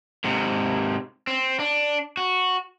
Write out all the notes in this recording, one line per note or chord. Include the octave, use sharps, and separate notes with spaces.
G#2 C3
C4
D4
F#4